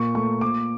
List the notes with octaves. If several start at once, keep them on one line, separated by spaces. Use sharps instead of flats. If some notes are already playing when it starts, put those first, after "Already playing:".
Already playing: A#2 C#6
A3 C#6
A#2 D6